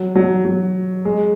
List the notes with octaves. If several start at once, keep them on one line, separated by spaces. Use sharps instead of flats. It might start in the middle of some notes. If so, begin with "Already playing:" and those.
Already playing: F#3
F#3
F#3
G#3